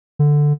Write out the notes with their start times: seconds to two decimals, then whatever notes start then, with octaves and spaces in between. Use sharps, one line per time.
0.19 D3